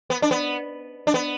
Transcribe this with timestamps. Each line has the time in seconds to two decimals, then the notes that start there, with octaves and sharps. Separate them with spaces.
0.10 B3
0.22 D4
0.31 B3
1.07 D4
1.14 B3